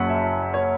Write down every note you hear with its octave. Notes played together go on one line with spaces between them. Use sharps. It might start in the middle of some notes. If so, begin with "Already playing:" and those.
Already playing: F#1 F#2 F#3 C#4 F#5 A5
E5
C#5